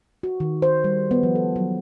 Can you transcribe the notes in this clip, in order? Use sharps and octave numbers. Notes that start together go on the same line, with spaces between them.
F#4
D#3
C5
G3
B3
F3
A4
F#3